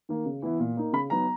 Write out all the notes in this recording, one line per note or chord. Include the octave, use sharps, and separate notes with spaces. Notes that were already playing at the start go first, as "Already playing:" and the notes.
D#3 A#3
C#3
E3 B3 E4
A#2
A#3 D#4
C#3 B5
F#3 B3 D#4 A#5